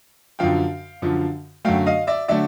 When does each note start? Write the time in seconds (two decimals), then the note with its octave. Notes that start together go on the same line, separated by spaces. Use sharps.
0.39 F#2 D3 F3 F5 G5
1.02 F#2 D3 F3
1.65 F#2 D3 F#3 A3 F5 G5
1.86 D#5 F5
2.07 D5 E5
2.28 D3 F#3 A3 D5 E5